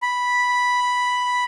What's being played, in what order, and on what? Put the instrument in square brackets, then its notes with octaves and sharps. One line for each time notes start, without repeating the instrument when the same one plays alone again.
[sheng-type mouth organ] B5